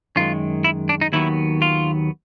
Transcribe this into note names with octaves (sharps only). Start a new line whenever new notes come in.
F#2 D#3 G#3 F4
E4
D4
D#4
D#2 D#3 F#3 B3 E4
F4